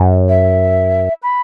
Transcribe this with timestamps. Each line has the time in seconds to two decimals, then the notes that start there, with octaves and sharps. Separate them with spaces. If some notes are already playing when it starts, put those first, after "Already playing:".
Already playing: F#2
0.29 E5
1.23 B5